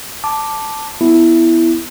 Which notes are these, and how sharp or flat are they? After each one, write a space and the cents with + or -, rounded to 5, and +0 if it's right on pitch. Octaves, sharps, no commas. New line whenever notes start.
A5 +0 D6 +0
B3 +0 E4 +0